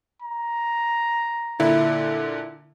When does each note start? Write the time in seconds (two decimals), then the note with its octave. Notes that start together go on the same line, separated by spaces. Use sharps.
0.22 A#5
1.60 A#2 D3 E4